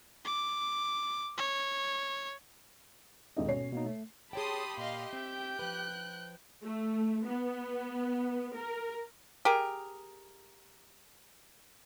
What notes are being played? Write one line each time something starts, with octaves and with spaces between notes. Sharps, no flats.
D6
C#5
D#1 G#2 D#5
B2 C#4 C#5 C7
B2 A#3 D#4
A3
G4 G#4 C#5 G5 A5 B5 C6 D#6
A#2 D#5 F5 C6
C4 E5 G5 G6
F3 B4 F#6
A3
B3
A#4
G4 G#4 A#4